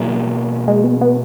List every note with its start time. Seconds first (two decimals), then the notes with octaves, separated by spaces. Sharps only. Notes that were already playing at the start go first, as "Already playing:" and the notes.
Already playing: B2 F#3 A#3 E4 G#4
0.68 G#3
0.84 B3
1.01 B3